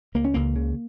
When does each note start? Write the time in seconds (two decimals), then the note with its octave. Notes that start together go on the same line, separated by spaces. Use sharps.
0.15 C#2 A#3
0.25 C#4
0.34 C#2 A#3
0.56 C#3